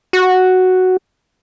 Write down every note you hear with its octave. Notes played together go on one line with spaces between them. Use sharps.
F#4